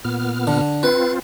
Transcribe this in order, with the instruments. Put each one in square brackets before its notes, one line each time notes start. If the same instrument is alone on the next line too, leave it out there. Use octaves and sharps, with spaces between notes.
[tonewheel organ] A#2 B3 F6
[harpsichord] D3
[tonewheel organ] C4 F4 [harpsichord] B4 F#5